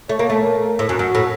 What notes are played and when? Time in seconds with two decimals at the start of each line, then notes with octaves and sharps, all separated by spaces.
0.09 A3 C#5
0.19 A#3
0.30 A3
0.39 A#4
0.79 A2
0.89 F#2
0.99 F#2 F#4
1.15 A2